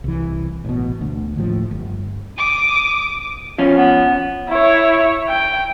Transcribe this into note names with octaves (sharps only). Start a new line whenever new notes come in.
C2 E3
A1 B2
D2
D#2 A2 F3
G1
D6 D#6
F3 C#4
B3
E4 C#5
G5